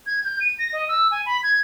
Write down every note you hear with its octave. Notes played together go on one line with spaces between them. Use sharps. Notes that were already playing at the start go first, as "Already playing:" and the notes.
G#6
G6
D#7
A#6
D#5
E6
G#5
B5
G#6